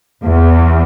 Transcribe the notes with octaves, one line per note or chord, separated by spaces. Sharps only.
E2